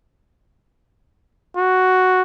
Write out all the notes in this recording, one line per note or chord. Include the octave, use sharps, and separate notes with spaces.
F#4